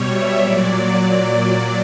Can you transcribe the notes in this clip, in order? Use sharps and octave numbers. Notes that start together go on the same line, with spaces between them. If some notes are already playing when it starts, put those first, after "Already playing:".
Already playing: B2 G3 C#5
E5
A#2 F#3 D5